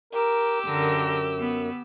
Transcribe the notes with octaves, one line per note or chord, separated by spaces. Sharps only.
G4 A#4 E6
F#2 D3 A#4
B3